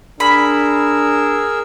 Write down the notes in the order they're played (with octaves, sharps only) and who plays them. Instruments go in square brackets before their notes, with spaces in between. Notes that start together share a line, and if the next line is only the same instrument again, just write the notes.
[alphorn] D4 [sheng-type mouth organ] G#4 A#4 E6 [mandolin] B5